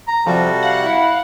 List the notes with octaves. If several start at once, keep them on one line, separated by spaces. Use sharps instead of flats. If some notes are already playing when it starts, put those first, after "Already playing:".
A#5
C3 F3 G3 F#4 A4
F5 F#5
E4 F5